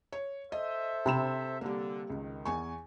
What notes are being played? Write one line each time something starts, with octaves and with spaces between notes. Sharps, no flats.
C#5
A4 C5 D#5 E5
C3 A#5 B5 E7
D3 G3 A#3
C#2 D#3
E2 G#5 C#6